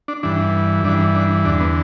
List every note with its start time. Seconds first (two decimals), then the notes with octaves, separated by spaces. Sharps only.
0.08 D4
0.23 G2 E3 D4
0.84 G2 E3 D4
1.15 D4
1.45 E2 D3 D4
1.60 B3